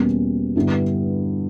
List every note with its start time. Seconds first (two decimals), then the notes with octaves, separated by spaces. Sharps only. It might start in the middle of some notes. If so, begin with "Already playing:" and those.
Already playing: E2 B2 G3 A#3 C#4
0.56 G2 D3 G3 B3 E4